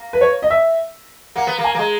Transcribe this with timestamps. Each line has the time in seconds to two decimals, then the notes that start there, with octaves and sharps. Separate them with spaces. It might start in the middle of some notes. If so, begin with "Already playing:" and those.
Already playing: A#3
0.13 B4
0.21 C#5
0.42 D#5
0.50 E5
1.36 A#3 F#5
1.47 B3
1.58 A#3
1.64 G#5
1.75 A#3
1.79 G#3